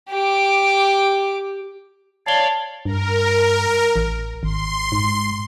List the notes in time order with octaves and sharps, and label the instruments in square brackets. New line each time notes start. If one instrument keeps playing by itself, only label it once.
[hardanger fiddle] G4 D6
[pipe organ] C#5 D5 F5 [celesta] A5 G7
[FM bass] G2 [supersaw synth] A#4
[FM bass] A1
[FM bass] G#1 [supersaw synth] C6
[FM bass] G#2